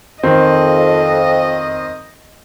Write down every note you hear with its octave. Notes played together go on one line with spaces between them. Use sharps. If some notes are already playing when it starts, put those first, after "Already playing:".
F2 D#3 C4 D#5